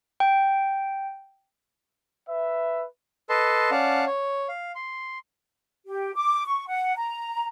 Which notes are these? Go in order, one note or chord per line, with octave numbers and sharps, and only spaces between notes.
G5
B4 E5
A4 B4 D#5 A5 C6
C#4 D5 F5 F#5 A5
C#5
F5
C6
G4
D6
C#6
F#5
A#5